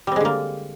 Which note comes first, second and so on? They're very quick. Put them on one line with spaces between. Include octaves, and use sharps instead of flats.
G3 C4 G#3 D3 A#3